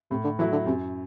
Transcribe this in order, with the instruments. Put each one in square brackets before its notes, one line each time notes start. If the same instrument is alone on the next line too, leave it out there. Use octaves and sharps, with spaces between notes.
[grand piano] A2 [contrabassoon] C3
[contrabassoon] D3
[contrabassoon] E3 [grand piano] F#3 A3 E4
[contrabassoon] D3
[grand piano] F#2 [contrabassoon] C3